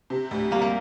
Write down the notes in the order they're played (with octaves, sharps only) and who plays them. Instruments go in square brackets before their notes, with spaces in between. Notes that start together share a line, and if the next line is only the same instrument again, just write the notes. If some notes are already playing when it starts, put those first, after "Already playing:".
[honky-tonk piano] C3
D2
[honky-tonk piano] G3 [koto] A#3
[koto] A#3